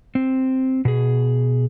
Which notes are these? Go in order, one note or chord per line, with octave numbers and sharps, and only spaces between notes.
C4
B2 G#4